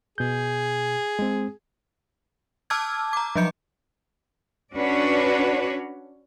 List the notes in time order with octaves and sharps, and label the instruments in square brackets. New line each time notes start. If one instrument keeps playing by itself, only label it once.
[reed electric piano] B2 G6 [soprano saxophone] G#4
[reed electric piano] G#3 C4
[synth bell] A5 D6 E6 F6 G#6
A#5 D6
F3 F#3 D#5 G6 C#7
[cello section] C#4 D4 F#4 B4 C#5 D5